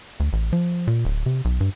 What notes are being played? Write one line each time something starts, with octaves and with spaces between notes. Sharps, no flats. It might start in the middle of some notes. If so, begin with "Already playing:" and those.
D2
A1
F3
A#2
D1
C3
B1
G2